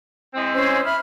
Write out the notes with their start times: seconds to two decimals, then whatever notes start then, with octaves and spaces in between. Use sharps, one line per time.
0.34 E3 G#3 C4
0.54 C#4 C5
0.84 E5 B5 F6